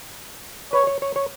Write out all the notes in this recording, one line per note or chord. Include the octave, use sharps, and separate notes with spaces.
B4 C#5
C#5
C#5
C#5